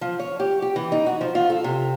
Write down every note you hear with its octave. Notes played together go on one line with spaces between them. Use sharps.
F3
C#5
G4
G4
E3
D#4
F#4
F3
F4
A4
C3